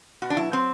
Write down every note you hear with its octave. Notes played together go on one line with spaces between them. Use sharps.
B2 F#4
D4
F#3 E4
F#3 C4